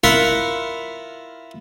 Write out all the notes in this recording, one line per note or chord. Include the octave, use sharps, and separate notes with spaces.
E4 F4 A#4 F#5 B5